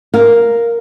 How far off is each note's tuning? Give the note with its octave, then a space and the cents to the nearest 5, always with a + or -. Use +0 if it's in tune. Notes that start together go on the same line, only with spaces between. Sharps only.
A#4 +0 F5 +0